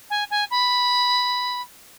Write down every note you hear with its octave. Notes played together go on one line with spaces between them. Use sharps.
G#5
G#5
B5